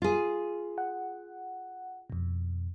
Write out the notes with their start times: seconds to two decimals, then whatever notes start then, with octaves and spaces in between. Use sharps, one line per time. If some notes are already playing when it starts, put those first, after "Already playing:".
0.02 F4 G#4
0.78 F#5
2.10 F2 B2